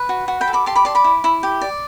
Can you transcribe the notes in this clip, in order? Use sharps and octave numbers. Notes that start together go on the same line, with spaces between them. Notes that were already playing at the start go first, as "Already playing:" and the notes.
Already playing: B4
F#4
F#4
G5 B5
A4
B5 D6
G4 A5 C6
B5 D6
D5 A5 C6
B5 D6
E4
E4
G4
D5